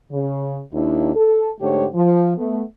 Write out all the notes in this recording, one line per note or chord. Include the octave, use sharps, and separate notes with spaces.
C#3
D#2 D4 E4
A4
G#2 D3 A3 G4 C5 C#5
F3
A3 B3